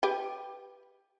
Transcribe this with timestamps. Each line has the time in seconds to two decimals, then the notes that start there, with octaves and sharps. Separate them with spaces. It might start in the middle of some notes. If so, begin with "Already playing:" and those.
0.03 G4 B4 G5